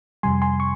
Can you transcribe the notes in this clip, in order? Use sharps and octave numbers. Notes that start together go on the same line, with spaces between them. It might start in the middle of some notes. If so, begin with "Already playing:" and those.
F2 C3 G3 G#5 C6
G#5 C6
C#6